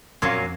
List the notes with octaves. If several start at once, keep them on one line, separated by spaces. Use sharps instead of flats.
F2 A#2 F#3 A#3 C#4